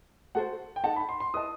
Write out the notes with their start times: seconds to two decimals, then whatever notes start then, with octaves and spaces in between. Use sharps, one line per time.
0.35 F#4 A4 C5 F#5
0.76 G5
0.84 D#4 A4 D#5 F#5 A5
0.96 B5
1.09 C6
1.20 C6
1.34 E4 B4 D#5 A5 D#6